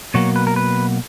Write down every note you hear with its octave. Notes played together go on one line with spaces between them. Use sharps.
B2 F#3 A#3 C#5
B4
A#4
B4